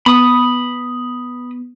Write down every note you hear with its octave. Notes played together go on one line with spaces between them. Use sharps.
B3 B5 D#6